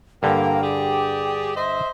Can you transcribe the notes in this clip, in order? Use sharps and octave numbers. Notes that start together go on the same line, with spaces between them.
G2 D3 A#3 G5
G4 G#4 D5
C5 D#5 E5